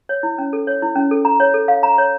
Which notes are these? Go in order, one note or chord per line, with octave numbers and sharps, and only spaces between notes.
C#5
E4
C#4
A4
C#5
E4
C#4
A4
A#5
C#5
A4
F5
A#5
C#5